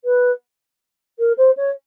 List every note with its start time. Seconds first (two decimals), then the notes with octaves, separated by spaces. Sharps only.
0.04 B4
1.19 A#4
1.37 C5
1.57 C#5